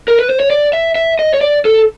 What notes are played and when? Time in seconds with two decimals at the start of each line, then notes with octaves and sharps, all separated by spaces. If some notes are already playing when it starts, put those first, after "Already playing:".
0.08 A#4
0.19 B4
0.30 C5
0.40 C#5
0.50 D5
0.73 E5
0.95 E5
1.19 D#5
1.34 C#5
1.41 D5
1.65 A4